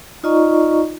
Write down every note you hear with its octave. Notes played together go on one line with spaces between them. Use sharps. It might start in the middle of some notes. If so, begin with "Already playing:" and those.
D#4 F4 D5 D#5 A#5 C#6